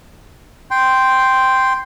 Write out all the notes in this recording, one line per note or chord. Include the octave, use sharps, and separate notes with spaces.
G5 C6